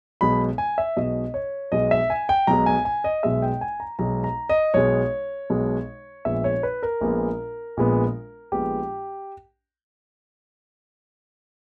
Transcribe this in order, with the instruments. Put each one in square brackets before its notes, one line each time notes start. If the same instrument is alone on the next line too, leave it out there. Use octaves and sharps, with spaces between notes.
[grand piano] B1 B2 G#3 B5
G#5
E5
B1 B2 G#3 D#5
C#5
B1 B2 G#3 D#5
E5
G#5
G5
B1 B2 G#3 A#5
G#5
G#5
D#5
B1 B2 G#3 E5
G5
G#5
A#5
B1 B2 G#3 A#5
A#5
D#5
B1 B2 G#3 C#5
B1 B2 G#3
A#1 A#2 G#3 B3 E5
C#5
B4
A#4
A#1 A#2 G#3 B3
A#1 A#2 G#3 B3
A#1 A#2 G#3 B3 G4